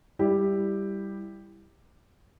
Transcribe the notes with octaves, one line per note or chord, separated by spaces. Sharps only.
G3 E4 G4